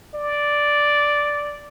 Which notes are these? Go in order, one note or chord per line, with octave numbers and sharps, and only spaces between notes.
D5